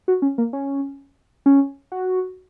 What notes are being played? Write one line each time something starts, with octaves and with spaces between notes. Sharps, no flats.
F#4
C#4
A#3
C#4
C#4
F#4